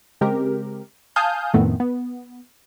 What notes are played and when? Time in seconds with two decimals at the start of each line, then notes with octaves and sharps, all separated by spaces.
0.21 C#3 G#3 C4 G4 A#4
1.16 F5 G#5 A5 D#6 F6 G6
1.54 F2 A2 D#3 A3 B3 C4
1.80 B3